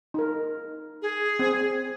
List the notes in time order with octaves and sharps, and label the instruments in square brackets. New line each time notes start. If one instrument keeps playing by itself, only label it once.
[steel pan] D#4 A#4
[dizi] G#4
[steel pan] C4